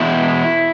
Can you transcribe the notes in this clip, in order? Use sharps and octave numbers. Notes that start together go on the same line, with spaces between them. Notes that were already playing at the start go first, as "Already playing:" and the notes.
Already playing: E2 B2 G#3 E4